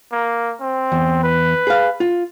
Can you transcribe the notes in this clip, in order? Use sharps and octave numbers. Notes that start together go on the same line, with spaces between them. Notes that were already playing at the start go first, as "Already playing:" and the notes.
A#3
C4
E2
B4
G#4 F5
F4